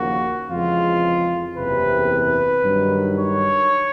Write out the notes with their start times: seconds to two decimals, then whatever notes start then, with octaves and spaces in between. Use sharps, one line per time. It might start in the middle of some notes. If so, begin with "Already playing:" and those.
Already playing: D#2 C#3 F3 A#3 F#4
0.51 F2 C#3 E3 G#3 F4
1.57 F#1 E2 C3 B4
2.64 G2 D#3 F#3
3.18 C#5